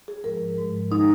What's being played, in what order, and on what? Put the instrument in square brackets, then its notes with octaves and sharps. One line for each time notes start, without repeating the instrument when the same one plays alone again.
[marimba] G#4
G#2 F3 G#3 A#4
G#2 F3 G#3
D#3 G#3 D#4